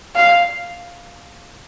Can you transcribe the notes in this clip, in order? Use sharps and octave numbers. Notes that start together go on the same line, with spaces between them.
F5